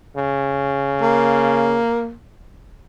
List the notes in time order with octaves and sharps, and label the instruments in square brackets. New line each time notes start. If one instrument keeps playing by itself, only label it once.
[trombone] C#3
[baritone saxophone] A#3